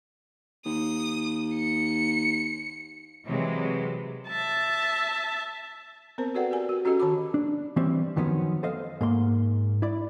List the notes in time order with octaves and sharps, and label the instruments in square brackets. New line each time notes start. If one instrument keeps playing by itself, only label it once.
[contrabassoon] D#2 [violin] D#6
[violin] C#7
[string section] C3 E3 F#3 G#3
[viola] E5 A5
[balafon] B3 C4 A#4 C5
F#4 A4 B4 D5 F#5 G5
G4 A#4 G#5
F#4
C#4 F#4 G4 A4 D#5
D#3 A5 B5 D6
[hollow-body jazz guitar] D4
E3 G3 C4 C#4
F#2 D#3 F3 B3 C#4
A4 C5 D#5 F5
G#2 A#3 C6
E4 D5